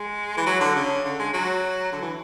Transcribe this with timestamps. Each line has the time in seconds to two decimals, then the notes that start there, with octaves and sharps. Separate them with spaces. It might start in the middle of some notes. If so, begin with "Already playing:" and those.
Already playing: G#3
0.37 E3
0.46 F#3
0.61 D3
0.75 C#3
1.04 D3
1.19 G#3
1.34 F#3
1.92 D3
2.02 E3